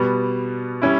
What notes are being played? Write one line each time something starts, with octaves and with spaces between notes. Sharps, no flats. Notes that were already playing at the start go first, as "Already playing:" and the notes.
Already playing: B2 G3 B3
G3 C#4 E4